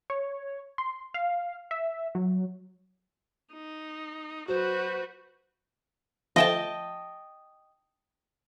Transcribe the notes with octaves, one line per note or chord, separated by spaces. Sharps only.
C#5
C6
F5
E5
F#3
D#4
F#3 F#4 B4 C5
F3 A3 D#5 G5 A5